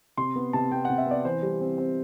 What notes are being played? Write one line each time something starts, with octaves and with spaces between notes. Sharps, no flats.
C3 C6
B3
C3 A5
B3 G5
C3 F#5
E5
B3 D5
E3 C5
G3
C4
C4